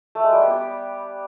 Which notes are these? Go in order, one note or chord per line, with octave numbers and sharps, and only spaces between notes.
A3
G#3
G3
B3
G4